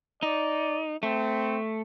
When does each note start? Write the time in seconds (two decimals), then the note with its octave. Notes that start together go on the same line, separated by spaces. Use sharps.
0.23 D#4 D5
1.03 A3 C4